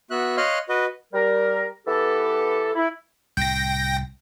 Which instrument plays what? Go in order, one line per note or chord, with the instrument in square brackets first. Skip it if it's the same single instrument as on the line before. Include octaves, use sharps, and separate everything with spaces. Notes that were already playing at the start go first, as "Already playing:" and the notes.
[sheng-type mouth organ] B3 F#4 E5 F#6
C#5 D#5 F5 C6 F6 F#6
F#4 B4 D#5
[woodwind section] G3 A#4
E3 B3 G4 A4
E4
[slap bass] C2 A2 [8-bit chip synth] G5 A#6